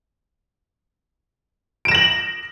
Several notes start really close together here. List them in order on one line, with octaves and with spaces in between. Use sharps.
D7 E7 A#6 F#7